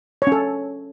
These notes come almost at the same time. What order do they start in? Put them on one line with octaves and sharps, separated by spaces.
C#5 C#4 A4